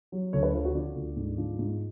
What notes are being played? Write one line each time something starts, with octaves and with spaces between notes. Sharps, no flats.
F#3
D2 C#5
B4
F3 F4
F#4
F3 D5
D2
G#2
F3
G#2